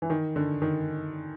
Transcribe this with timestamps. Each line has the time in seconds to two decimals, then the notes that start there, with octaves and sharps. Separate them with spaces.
0.02 E3
0.10 D#3
0.36 D3
0.62 D#3